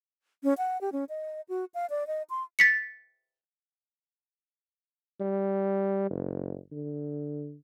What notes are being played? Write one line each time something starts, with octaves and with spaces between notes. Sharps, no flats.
C#4
F#5
G4
C#4
D#5
F#4
F5
D5
D#5
C6
A6 B6 C#7
G3
F#1
D3